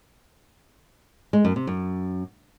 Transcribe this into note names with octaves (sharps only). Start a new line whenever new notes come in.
G#3
F#2
C3
F#2